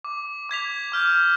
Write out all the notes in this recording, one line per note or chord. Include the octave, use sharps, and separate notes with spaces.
D6
D6 G#6 B6 F7
D6 F6 G6